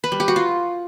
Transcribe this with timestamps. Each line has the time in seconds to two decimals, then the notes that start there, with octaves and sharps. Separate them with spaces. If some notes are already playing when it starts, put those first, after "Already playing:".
0.04 B4
0.12 G3
0.20 G4
0.28 F#4
0.36 F4